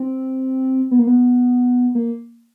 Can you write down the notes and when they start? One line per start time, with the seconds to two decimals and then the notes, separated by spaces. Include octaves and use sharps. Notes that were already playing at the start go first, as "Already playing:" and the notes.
Already playing: C4
0.91 B3
0.99 A#3
1.07 B3
1.95 A#3